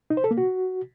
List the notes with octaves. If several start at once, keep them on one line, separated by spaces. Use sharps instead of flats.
D#4
C5
A4
A#3
F#4